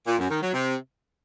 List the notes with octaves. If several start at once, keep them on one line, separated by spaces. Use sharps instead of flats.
A#2
F#2
D#3
F#3
C3